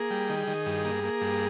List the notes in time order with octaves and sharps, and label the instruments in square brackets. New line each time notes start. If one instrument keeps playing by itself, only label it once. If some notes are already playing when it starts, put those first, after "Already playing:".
Already playing: [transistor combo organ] A#3 [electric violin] G#4
[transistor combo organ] G3
D#3
D#3
G2
A#3
A#3
G2